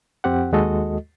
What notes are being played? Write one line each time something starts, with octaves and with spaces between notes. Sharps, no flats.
F2 C4 G4 F#5
D#2 G#3 F#4 A4 D#5